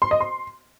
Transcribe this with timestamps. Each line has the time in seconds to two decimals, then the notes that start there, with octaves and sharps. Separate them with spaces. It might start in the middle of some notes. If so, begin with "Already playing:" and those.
0.02 C6
0.11 D#5
0.20 C6